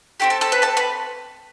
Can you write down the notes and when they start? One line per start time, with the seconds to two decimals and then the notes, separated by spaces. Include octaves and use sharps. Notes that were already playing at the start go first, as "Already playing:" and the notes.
0.20 C4 F#4 G4 A4 G5
0.30 A4 A5
0.41 A4 A5
0.52 B4 B5
0.62 A4 A5
0.77 B4 B5